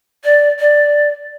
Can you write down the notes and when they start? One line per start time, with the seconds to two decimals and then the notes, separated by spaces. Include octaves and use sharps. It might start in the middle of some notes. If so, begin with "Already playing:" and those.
0.24 D5
0.60 D5